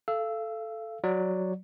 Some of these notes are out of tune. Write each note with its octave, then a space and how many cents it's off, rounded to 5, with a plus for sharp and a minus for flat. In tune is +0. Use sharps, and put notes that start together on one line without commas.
A4 -5 F5 -35 E6 +0
F#3 +0 D5 +5